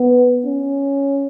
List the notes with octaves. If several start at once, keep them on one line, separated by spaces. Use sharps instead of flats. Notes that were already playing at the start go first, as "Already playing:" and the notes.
Already playing: B3
C#4